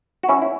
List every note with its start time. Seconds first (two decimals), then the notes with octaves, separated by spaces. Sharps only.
0.23 F#4
0.29 C#4 E4
0.42 E4